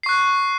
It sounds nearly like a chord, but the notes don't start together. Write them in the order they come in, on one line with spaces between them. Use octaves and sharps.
C7 C#6 F#6